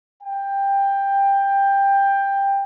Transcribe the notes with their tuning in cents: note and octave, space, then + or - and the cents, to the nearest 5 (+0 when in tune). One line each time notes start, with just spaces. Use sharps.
G5 +15